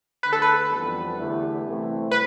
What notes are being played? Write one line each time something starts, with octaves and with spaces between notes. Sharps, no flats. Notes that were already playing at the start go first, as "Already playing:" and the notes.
D3 A3 D4 B4
A4
B4
F2 E3 G3 B3
E2 D3 A3 E4 G4
C2 C3 E3 A3 C4
B4